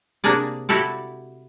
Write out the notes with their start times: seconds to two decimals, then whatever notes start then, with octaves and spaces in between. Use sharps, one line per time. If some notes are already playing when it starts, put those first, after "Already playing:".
0.24 C3 A#3 D4 G#4 D5
0.69 E4 F#4 G4 A4 D5